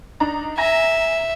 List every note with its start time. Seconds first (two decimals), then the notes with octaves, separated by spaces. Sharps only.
0.20 D4 D#4 A#5
0.58 E5 G#5 A#5 A#6